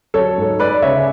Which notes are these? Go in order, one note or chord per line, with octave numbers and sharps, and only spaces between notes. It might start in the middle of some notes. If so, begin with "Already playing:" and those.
F#3 A4 C#5
G#2
G#3 B4 D5
C#3 C#5 E5